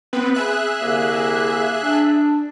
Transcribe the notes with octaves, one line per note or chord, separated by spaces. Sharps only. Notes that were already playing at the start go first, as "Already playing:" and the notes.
B3 C4 B4
G#4 E5 F#6
C2 D3 A#3
D4